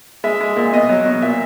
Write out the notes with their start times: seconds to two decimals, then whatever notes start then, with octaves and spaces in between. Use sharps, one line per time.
0.24 G#3 E5
0.41 G#3
0.57 A#2
0.73 B2 D#5
0.89 F#3
1.06 B2
1.22 A#2 E5